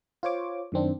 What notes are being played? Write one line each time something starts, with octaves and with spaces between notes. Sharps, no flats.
F4 C5 C#5 D6
F#2 D#3 C4 D4